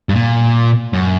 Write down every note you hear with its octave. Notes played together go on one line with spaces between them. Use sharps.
G2
A#2
F#2